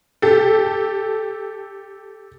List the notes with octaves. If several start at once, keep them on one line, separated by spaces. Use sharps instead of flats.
G4 A4